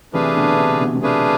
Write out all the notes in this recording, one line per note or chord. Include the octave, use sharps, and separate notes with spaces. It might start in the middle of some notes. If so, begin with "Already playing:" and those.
C3 E3 A3 D4 G#4 B4 F5
B2 D3
C3
B2
B2
C3 A3 D4 G#4 B4 F5